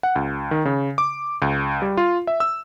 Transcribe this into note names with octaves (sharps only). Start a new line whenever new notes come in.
F#5
C#2
D#3
C#3
D6
C#2
G3
F4
E5
E6